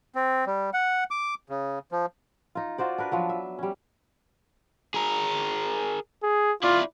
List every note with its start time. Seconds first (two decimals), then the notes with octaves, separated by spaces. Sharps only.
0.15 C4
0.46 G3
0.73 F#5
1.11 D6
1.49 C#3
1.92 F3
2.55 D#4 F4
2.78 F4 F#4 C5 D5
2.98 D4 A#4 B4
3.12 F3 F#3 B3
3.29 E5
3.59 G3 C#4
4.94 G#4 A#4
6.23 G#4
6.63 E4 F4 D5